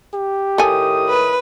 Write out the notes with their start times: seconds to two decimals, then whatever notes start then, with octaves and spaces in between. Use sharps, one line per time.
0.14 G4
0.58 A2 D#3 A4 G#5 D#6
1.09 B4